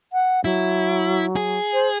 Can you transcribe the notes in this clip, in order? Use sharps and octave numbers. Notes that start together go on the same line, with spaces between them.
F#5
F#3 E4
G#4
C5